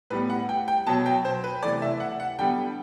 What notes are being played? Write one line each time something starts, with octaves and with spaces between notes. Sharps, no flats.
A2 G3 B3 B4
F#5
G5
G5
B2 F#3 B3 A5
G5
C5
B4
C3 E3 A3 D5
E5
F#5
F#5
D3 G3 B3 G5